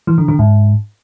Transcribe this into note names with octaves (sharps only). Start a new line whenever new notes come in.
E3
D3
D3
G#2